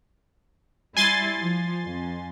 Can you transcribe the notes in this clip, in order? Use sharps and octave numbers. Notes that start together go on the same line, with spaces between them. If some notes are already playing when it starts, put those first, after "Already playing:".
G3 E4 G#5 C6 A6
F3
F2